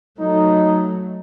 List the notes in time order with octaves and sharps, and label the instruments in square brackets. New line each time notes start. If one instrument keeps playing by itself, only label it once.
[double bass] F#3 A3 [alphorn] D#4